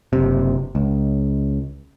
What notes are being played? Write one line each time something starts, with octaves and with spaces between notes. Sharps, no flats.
F#1 C3
C#2